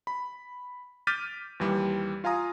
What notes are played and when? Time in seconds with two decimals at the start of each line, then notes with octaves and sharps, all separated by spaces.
0.07 B5
1.07 D6 F6 G6 A6 B6 D#7
1.60 D#2 E3 G3
2.24 F4 F5 G#5 A#5 D#6